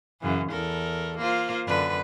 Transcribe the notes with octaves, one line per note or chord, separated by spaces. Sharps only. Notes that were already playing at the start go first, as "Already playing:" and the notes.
F#2 C#3 E3
E2 A4 A#4
A#3 F4 C5
F#2 D3 B4